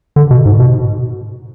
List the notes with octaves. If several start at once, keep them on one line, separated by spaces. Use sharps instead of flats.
D3
B2
G#2
B2